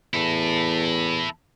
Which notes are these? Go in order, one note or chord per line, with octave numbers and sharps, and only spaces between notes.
E2 E4 A4